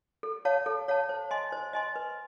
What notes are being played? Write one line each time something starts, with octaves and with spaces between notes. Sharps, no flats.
A4
C#5 F5 A5
A4
C#5 F5 A5
C5
D#5 G#5 C6
C5
D#5 G#5 C6
B4